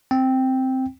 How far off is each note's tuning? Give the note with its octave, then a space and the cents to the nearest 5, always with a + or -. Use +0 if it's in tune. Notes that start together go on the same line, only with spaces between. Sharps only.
C4 +0 G5 +0